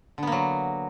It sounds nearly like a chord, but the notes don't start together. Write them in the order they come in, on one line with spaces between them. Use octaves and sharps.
D3 B3 A#3 F#3